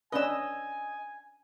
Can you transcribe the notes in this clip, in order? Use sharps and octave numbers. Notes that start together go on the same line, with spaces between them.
C#4 D4 B4 D#5 G#5 E6